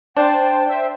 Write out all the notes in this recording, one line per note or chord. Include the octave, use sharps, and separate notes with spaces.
D4 C5 G5 A5
C5 E5